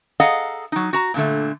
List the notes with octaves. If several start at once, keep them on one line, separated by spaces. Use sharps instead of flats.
G#4 A4 D#5 F5 F#5 A#5
F#3 D#4
F#4 A#5
A#2 D3 A3